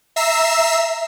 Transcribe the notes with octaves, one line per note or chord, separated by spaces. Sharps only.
E5 A#5 E6 C7 E7